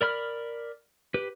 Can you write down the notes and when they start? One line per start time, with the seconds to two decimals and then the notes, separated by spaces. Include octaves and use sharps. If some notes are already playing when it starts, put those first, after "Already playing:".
0.01 A#4 D5 B5 F6
1.14 G4 B4